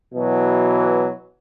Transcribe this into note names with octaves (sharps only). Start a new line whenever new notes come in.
B2 E3 F#3